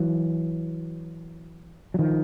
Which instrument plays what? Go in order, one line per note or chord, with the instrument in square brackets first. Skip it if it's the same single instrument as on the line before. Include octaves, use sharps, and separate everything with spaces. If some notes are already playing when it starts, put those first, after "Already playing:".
Already playing: [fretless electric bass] E3 F#3
F#3
D#3 F3